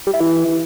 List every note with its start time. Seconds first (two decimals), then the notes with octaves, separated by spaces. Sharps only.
0.07 G3
0.14 E4
0.20 E3